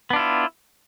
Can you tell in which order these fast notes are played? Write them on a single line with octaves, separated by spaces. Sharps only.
B3 D4 F4 E4